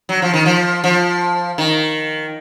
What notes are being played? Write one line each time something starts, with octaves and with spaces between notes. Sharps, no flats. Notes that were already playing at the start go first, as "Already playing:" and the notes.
F#3
F3
D#3
F3
F3
D#3